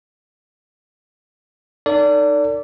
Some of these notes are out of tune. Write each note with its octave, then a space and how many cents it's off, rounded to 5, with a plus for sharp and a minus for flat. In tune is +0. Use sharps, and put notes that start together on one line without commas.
D#4 -20 A4 +40 D5 -25